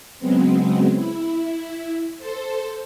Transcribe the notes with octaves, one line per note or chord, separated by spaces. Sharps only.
C#3 F#3 G#3 B3 C4
E4
A4 C5